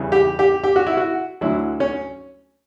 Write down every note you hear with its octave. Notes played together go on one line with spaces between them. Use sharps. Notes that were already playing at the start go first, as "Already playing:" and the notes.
Already playing: E2 C#3 E3 G3
G4
G4
G4
F#4
E4
F#4
D2 D3 F#3 E4
C#4